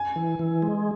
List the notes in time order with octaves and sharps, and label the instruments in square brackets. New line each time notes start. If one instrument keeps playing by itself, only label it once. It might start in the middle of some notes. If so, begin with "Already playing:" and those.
Already playing: [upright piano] G#5
[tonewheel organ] E3
E3
G#3